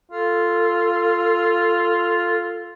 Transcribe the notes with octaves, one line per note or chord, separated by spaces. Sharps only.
F4 A4